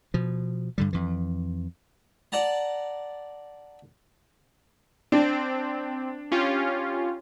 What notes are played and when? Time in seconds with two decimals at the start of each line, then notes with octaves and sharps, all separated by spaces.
0.14 B2 F3
0.78 G2 D3 G3
0.93 F2 E3
2.32 D5 F#5 A5 A#5
5.12 C4 D4
6.32 C#4 F4 G4